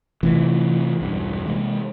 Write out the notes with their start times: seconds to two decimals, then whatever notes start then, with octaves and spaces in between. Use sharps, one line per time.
0.23 C3 E3 A3 C#4
1.00 B1 E2 G2
1.46 C3 G#3 A#3